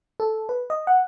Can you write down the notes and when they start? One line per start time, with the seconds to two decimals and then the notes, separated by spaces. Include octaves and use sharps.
0.20 A4
0.49 B4
0.70 D#5
0.87 F#5